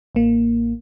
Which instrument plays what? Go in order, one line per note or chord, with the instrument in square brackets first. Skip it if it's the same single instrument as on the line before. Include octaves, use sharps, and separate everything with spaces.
[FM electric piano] A1 A#3